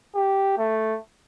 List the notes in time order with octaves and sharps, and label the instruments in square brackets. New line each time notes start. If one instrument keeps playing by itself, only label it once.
[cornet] G4
A3